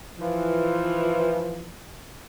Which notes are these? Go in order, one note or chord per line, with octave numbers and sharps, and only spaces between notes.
E3 F3